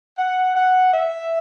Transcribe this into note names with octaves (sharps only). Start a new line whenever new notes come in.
F#5
F#5
E5